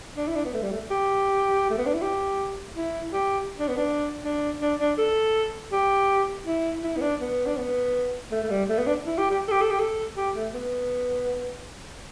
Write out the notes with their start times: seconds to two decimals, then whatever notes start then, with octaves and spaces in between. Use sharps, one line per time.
0.16 D4
0.27 E4
0.36 D4
0.45 B3
0.54 A3
0.62 G3
0.72 A3
0.90 G4
1.70 A3
1.78 B3
1.86 D4
1.94 E4
2.02 G4
2.76 E4
3.12 G4
3.59 D4
3.68 B3
3.77 D4
4.24 D4
4.61 D4
4.79 D4
4.98 A4
5.72 G4
6.46 E4
6.83 E4
6.97 B3
7.01 D4
7.21 B3
7.46 D4
7.57 B3
8.31 A3
8.44 A3
8.50 G3
8.69 A3
8.78 B3
8.87 D4
9.06 E4
9.18 G4
9.30 G4
9.48 A4
9.51 G4
9.61 A4
9.71 G4
9.79 A4
10.17 G4
10.35 A3
10.53 B3